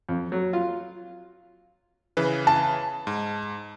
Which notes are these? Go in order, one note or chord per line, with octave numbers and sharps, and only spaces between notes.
F2
F#3
F4
C#3 E3 B4
A5
G#2